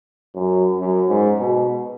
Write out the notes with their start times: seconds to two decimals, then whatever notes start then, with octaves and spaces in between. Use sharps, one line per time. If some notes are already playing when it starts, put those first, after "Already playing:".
0.35 F#2
0.80 F#2
1.09 G#2
1.40 B2